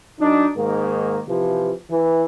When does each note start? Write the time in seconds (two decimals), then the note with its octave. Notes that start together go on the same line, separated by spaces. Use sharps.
0.19 F#2 D4 D#4
0.57 G#2 D#3 A#3
1.28 C3 E3 F3
1.90 E3